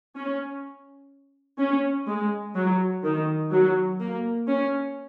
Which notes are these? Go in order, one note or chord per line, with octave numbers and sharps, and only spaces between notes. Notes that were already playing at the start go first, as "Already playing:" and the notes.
C#4
C#4
G#3
F#3
D#3
F#3
A#3
C#4